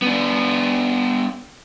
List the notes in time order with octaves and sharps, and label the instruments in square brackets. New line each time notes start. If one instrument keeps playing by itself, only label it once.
[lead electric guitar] B3 D4